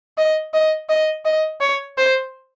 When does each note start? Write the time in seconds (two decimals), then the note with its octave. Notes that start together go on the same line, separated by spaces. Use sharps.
0.18 D#5
0.53 D#5
0.89 D#5
1.25 D#5
1.61 C#5
1.98 C5